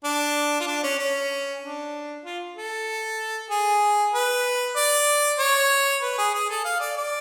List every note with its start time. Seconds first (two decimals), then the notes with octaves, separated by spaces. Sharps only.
0.04 D4
0.60 F4
0.67 D4
0.84 C#4
0.99 C#4
1.61 D4
2.24 F4
2.56 A4
3.50 G#4
4.13 B4
4.76 D5
5.39 C#5
6.02 B4
6.18 G#4
6.34 G#4
6.50 A4
6.65 F5
6.80 D5
6.97 D5